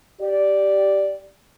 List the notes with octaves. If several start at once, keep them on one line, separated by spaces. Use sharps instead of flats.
G4 D5